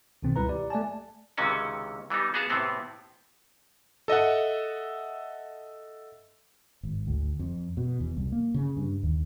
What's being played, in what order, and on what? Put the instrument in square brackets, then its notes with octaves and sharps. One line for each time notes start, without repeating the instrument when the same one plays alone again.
[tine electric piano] B1 B2 D#3 C4
C#2 G3 E4 B4 A#5
G4 D5
A3 D5 G#5 A5
[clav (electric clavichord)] C#2 C3 D#3 E3 C#4 F#4
E3 G3 B3 D#4
B3 F#4 G#4 F5 A5
A2 C3 E3 B3 C4
[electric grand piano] A4 D#5 E5 F#5
[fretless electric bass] G#1
D2
F2
B2
E2
C2
A#3
C#3
G2
D#2